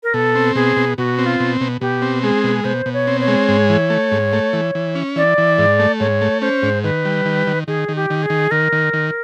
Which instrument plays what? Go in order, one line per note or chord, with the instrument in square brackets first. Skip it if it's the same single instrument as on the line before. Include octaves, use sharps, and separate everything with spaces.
[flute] A#4
[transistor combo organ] B2 [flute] A4
[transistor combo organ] C4
[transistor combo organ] B2 [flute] G#4
[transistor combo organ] B2
[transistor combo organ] B2 [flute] F#4
[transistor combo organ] C4
[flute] F4
[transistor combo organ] B2
B2
[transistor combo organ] B2 [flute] G4
[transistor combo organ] C4
[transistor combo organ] G#3 [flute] G#4
[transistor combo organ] B2
[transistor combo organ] B2 [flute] C5
[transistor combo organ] B2
[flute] C#5
[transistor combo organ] C4
[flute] C#5
[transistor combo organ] G#3
G#2
E3
A3
G#2
A3
E3
E3
C#4
[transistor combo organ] E3 [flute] D5
[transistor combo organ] E3
G#2
A3
[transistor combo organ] G#2 [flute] C#5
[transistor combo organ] A3
[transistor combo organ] C#4 [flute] C5
[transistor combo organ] G#2
[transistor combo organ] D#3 [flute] B4
[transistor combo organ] G3
D#3
D#3
[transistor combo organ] D#3 [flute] G#4
[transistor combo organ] D#3
[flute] G4
[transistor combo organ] D#3
[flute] G#4
[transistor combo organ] D#3
[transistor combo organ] D#3 [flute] A#4
[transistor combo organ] D#3
D#3